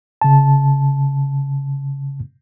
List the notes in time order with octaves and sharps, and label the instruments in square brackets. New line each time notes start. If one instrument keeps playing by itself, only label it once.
[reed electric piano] C#3 A5